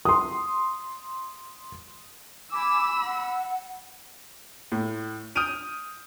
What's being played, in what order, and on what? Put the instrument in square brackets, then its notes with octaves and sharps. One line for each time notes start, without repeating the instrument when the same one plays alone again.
[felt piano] C6 D#6
[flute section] G#5 D6 [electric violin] B5 E6
[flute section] F#5
[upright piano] A2
D#6 F6 G6 D7 D#7 F7